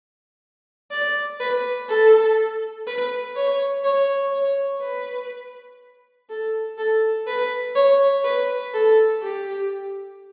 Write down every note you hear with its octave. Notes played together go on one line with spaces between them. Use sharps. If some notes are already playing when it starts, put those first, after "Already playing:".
D5
B4
A4
B4
C#5
C#5
C#5
B4
A4
A4
B4
C#5
B4
A4
G4